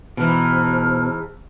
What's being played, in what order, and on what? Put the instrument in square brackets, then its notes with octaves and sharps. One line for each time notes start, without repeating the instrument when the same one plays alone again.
[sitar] G#2 E3 [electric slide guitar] B2 [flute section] C5 A5 F6